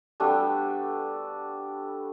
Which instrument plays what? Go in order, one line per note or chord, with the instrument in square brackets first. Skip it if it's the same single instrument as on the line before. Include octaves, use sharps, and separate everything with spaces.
[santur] G3 A3 B3 D4